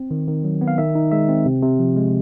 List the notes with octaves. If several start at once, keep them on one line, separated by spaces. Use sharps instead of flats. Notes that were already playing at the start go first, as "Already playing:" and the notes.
Already playing: C4
D#3
D#3
F#3
B3
F5
D#3 E5
D#4
G#3 E5
C4
C3
C3
F3
G#3